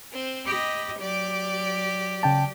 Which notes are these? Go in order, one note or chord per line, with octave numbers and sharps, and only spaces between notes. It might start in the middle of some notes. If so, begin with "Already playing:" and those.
C4 C5
G4 D#5 B5
F#3 G4 D5 D6
C#3 G5 A5